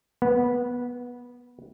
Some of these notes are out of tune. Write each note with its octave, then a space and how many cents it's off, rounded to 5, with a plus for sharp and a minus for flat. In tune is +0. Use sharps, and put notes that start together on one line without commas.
B3 -15